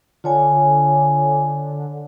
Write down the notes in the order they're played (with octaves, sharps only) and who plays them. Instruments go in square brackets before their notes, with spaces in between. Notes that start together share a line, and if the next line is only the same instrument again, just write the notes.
[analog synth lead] D3 [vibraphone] F4 C#5 G#5